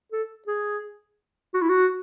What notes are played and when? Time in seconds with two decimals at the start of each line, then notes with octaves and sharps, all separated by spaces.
0.12 A4
0.47 G#4
1.54 F#4
1.62 E4
1.69 F#4